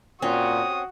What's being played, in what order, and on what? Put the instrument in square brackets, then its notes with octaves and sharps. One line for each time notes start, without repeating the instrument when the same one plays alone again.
[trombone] A#2 [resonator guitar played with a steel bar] C4 C#4 [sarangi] F#4 [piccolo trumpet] D#6